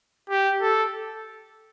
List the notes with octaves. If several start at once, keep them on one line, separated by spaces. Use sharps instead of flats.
G4
A4